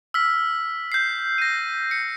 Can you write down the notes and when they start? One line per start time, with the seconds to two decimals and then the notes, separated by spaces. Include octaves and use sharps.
0.14 E6 F6 B6
0.92 G6 C7
1.38 A#6 D#7
1.91 C#7